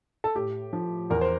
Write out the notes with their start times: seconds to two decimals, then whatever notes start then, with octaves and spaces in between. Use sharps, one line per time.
0.24 A4
0.35 A2 G4
0.73 F3
1.10 E2 A#4
1.21 C5